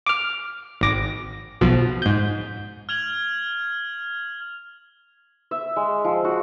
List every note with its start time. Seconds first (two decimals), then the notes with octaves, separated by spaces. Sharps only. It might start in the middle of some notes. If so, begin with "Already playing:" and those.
0.06 D6 F6
0.81 G#1 D6 A#6
1.61 B1 B2 F3
2.02 G#2 G6
2.89 F6 G#6 F7 F#7
5.51 E5
5.76 G#3
6.04 F3
6.24 F#4